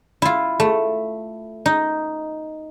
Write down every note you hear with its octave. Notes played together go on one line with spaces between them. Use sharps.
E4 F4
A3
D#4